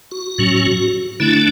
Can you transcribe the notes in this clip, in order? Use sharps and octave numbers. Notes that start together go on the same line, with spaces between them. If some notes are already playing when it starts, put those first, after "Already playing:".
F#4
A2 F#3 C#4
D3 A3 D4 E4